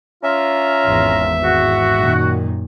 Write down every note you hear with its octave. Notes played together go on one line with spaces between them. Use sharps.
C#4 F4 E5 A#5
G#1 E2
F#4
F#2 A#2 D#3